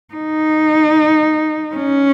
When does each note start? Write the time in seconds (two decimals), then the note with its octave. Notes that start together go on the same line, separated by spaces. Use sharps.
0.14 D#4
1.74 C#4